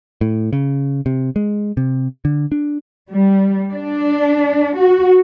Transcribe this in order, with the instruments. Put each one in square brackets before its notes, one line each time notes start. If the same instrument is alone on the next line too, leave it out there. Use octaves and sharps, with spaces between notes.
[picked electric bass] A2
C#3
C3
G#3
C3
D3
D4
[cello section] G3
D4
F#4